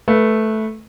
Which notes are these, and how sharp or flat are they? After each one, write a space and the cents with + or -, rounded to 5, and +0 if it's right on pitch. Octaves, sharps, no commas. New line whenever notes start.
A3 -10 B4 -15